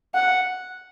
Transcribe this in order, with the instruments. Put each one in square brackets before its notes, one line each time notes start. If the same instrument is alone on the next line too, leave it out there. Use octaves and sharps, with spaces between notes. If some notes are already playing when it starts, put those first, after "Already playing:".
[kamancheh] F#5